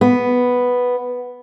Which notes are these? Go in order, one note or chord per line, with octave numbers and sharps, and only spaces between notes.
B3